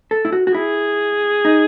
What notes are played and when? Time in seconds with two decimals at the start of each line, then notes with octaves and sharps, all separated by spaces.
0.11 A4
0.25 E4
0.32 F#4
0.47 F#4
0.54 E4 G#4
1.45 D#4